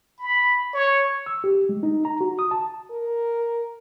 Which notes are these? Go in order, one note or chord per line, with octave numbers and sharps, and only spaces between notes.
B5
C#5
E6
G4
G#3
D#4
A#5
F#4
D#6
A5
A#4